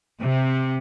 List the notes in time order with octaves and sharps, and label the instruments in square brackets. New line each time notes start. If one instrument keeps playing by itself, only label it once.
[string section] C3